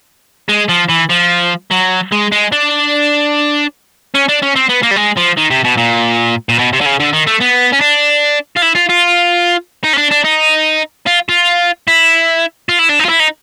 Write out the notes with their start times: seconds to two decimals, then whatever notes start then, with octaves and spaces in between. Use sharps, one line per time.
0.49 G#3
0.69 F3
0.89 E3
1.10 F3
1.71 F#3
2.12 G#3
2.32 G#3
2.52 D4
4.14 C#4
4.28 D4
4.42 C#4
4.55 C4
4.69 B3
4.83 A#3
4.91 G3
4.96 G#3
5.17 F3
5.37 D#3
5.50 C3
5.64 B2
5.77 A#2
6.49 A#2
6.59 B2
6.73 C3
6.81 D3
6.86 C#3
7.00 D3
7.13 D#3
7.27 A3
7.40 B3
7.72 C#4
7.80 D4
8.57 F4
8.63 E4
8.76 F4
8.90 F4
9.84 D#4
9.93 C#4
9.98 D4
10.11 D4
10.25 D#4
11.07 F4
11.29 F4
11.88 E4
12.69 F4
12.79 E4
12.89 D4
13.00 D#4
13.05 F4
13.10 E4
13.20 D#4